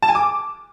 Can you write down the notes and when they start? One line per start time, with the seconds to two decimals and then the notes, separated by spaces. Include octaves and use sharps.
0.02 A5
0.09 G#5
0.15 D6